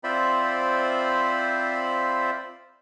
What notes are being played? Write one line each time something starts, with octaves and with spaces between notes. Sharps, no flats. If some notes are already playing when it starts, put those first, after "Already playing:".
C4 F4 C5 D5 E5 B5